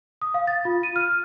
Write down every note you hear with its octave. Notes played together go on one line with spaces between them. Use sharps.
D#6
F5
A6
F4
D#7
F6